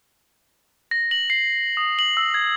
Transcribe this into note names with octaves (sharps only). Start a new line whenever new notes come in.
A#6
F#7
C7
D#6
F#7
E6
G#6